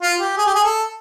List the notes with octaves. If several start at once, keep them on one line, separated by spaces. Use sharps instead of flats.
F4
G4
G#4
G4
G#4
A4